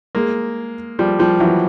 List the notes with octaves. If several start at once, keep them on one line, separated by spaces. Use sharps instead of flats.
G#3 A#3
F3 G3
F3 G3
E3 F#3